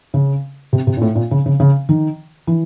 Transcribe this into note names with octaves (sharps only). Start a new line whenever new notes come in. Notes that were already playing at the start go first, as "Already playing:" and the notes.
C#3
C3
C3
A#2
A2
A#2
C#3
C#3
C#3
D#3
E3